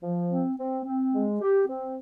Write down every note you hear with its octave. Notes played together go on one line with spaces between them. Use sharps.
F3
C4
C4
C4
G#3
G4
C4